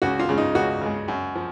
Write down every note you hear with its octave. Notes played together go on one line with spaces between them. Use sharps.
C#2 F#4
F4
C#3 G#3
D#4
C#2 F#4
C#3 G#3
F#2
F3